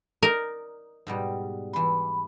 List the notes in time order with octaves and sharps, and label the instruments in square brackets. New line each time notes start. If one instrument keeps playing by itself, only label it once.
[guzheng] D#4 D5 [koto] A#4
[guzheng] G#2 B2 G3
[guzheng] E3 C6 [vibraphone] B5